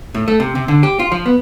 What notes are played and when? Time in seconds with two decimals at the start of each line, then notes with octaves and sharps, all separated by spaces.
0.14 A2
0.28 A3
0.40 C3
0.55 C3
0.68 D3
0.83 G4
0.99 F4
1.12 F3
1.26 B3